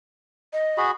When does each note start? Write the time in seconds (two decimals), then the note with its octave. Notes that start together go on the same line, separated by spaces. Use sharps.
0.53 D#5
0.78 F#4 G#4 B5